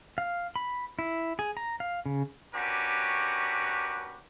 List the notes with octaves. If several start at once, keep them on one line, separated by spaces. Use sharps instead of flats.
F5
B5
E4
G#4
A#5
F5
C#3
C#4 D4 F#4 G4 A#4 B4